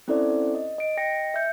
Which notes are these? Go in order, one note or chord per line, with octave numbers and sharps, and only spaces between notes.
C4 C#4 E4 A4 C5 D5
D#5
D#5 D7
D#5 G5 A#6 C#7
E5 G6 C#7